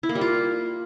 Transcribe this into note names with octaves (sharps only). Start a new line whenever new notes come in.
E4
A#3
G3
F4